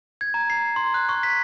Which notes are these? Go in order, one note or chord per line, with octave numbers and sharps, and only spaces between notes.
G#6
A#5
C7
C6
F#6
C#6
B6